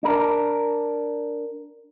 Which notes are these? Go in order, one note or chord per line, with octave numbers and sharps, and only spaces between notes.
D4 A#4